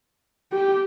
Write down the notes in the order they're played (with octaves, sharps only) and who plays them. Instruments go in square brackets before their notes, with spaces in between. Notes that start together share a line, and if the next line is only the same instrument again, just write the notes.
[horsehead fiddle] G4